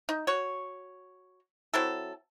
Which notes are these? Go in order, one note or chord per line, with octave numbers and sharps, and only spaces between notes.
D#4
F#4 C#5
F#3 C4 E4 A4